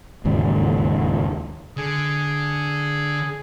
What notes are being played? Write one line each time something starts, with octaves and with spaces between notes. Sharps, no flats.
E1 D#2 G#2 C#3
D3 G#4